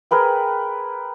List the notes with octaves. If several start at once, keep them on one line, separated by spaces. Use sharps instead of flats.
G#4 A#4 B4 G5